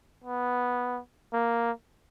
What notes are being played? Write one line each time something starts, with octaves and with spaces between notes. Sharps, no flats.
B3
A#3